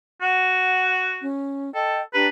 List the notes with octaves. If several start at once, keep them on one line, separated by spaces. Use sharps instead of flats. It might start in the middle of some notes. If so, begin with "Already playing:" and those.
F#4 F#5
C#4
A4 D#5 G5
D4 G4 B4 A#5